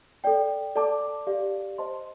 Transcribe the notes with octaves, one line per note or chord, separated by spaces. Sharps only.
A4 D5 G5
A4 D5 A5 D6
G4 D5 F5
C5 D#5 A5 C6